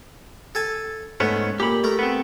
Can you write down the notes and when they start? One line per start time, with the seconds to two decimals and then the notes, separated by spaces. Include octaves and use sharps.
0.55 A4 G#5 A5
1.20 G#2 A3 B3 C#4
1.60 A#2 G4 B5
1.84 A3 A#4
1.99 B3 C4